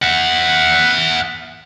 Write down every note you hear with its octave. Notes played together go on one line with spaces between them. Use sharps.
E5 F#5